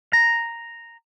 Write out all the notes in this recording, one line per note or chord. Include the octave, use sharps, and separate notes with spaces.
A#5